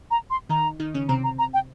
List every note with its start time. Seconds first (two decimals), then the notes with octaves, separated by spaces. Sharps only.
0.11 A#5
0.30 C6
0.49 D#3 D#4 A#5
0.80 D#3 D#4
0.94 C#3 C#4
1.09 C3 C4 A#5
1.24 A#5
1.39 A#5
1.54 G5